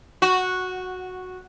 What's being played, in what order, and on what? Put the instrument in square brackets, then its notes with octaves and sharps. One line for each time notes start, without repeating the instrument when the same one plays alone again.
[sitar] F#4